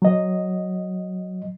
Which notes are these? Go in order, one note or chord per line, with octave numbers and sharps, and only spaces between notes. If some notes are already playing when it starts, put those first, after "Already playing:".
F#3 D#5